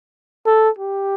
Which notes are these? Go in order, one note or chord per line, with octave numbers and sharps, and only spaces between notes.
A4
G4